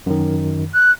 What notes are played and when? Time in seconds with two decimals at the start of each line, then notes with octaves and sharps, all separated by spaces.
0.06 F#2 D#3
0.74 F#6